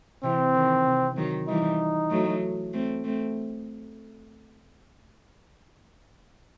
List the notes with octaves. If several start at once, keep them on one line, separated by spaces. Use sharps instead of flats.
C3 E3 C4
D#3
C3
D#3 F#3
E3 G3 D#4
F#3 A3
A3 C4
A3 C4